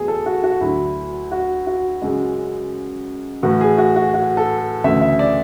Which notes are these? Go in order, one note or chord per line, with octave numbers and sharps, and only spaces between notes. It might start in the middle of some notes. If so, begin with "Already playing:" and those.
Already playing: E2 F#3 A3 G#4
A4
F#4
F#4
D2 D3 F#3 E4
F#4
F#4
F#2 C#3 G#3
A2 E3 A3 F#4
G#4
F#4
F#4
F#4
A4
D2 C#3 E3 A3 E5
E5
D5